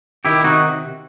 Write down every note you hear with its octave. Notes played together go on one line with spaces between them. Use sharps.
D#3 E4 G4
C3 D#4 F#4